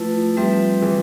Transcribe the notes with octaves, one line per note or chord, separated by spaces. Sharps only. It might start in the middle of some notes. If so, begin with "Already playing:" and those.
Already playing: F3 A3 E4 B4
F3 G3 C4 G4 B4 E5
E3